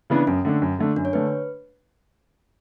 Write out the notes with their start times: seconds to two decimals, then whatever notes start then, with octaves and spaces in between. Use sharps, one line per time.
0.10 C#3 E3 B3 D4
0.27 F#2 C#4
0.45 D3 A3 D4
0.62 F#2
0.79 D3 A3 D4
0.96 F#2 D4
1.05 C#5
1.13 D3 A3 D4 B4